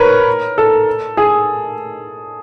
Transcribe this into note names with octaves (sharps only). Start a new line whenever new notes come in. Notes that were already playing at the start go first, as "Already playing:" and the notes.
Already playing: A#4 B4 C#5
A4
G#4